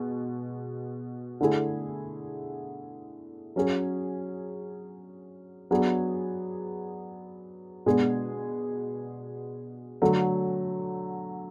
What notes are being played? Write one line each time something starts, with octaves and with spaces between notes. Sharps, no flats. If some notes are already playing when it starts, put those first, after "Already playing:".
Already playing: B2 G#3
D3 A3 E4 G#4
F#3 C#4 G#4
F#3 B3 D4 G#4
B2 G#3 B3 D4 G#4
D3 F#3 A3